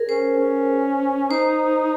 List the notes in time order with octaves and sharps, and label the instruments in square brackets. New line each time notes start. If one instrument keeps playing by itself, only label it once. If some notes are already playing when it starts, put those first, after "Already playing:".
Already playing: [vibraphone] G#4 A#4
[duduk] C#4 [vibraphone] C5
[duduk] C#4
[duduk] D#4 [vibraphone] C5